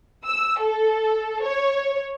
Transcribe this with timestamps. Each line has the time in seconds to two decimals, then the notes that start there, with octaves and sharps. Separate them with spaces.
0.24 E6
0.60 A4
1.45 C#5